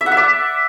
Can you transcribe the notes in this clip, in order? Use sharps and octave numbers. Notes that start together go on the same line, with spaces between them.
E5
F#5
E5
D5